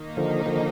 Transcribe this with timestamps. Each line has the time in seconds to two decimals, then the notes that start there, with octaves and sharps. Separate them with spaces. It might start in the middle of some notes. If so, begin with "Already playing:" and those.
Already playing: D#3 A#3 D#4
0.17 D3 F3
0.46 D3 F3